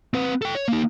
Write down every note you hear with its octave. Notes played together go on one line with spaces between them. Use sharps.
C4 B4
A4 G5
C#5
A#3 D#4